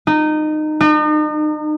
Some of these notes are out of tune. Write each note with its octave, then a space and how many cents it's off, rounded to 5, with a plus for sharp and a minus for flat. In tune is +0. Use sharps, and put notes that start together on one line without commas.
D#4 -20
D#4 -40